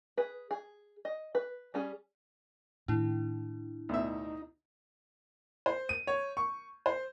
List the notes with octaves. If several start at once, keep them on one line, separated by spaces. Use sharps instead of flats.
G#4 B4
G#4
D#5
B4
G3 C#4 G#4
A2 D#3 D4 E4
D2 B2 D#4 E5
C5
D#7
C#5
C#6
C5